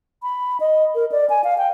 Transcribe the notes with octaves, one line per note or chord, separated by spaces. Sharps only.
B5
D#5
A#4
D5
G#5
F5
G5